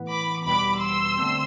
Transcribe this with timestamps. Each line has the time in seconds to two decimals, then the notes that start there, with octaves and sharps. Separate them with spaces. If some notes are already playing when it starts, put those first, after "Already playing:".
Already playing: A2 E3 B3
0.10 B5 D6
0.45 E2 B2 G3 B3 B5 D6
0.81 C6 E6
1.17 D3 A3 C4